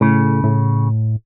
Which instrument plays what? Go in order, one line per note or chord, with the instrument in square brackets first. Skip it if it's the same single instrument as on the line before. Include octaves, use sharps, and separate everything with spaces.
[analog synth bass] A2 [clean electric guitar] C#3
[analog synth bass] A2